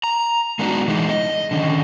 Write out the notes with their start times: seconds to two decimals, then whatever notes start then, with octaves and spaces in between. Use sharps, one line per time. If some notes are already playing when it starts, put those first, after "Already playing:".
0.04 A#5
0.59 G#3 A3 B3 D4 D#4 F#4
0.88 E3 G#3 D#4
1.09 D#5
1.51 D3 D#3 C#4